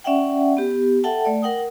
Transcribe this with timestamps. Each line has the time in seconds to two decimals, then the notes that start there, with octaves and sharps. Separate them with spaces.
0.04 C#4 D5 E5 F#5 G5
0.57 B3 G4
1.04 A4 E5 F#5 G5 A5
1.25 A3 D5
1.42 A#4 F#5 G5 D#6